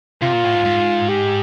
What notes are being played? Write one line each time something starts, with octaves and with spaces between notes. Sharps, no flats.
C3 F4
A#2
A2
G#2
G#2
G4